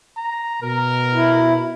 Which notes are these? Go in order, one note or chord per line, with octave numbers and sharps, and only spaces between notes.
A#5
B2 A#4
E4